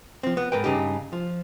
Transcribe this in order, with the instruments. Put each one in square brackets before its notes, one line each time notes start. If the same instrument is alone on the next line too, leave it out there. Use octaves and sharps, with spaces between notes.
[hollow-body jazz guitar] F3 C4
B3
G#2 A#4 B4 G5
G2 C#3 D#4 G4
F3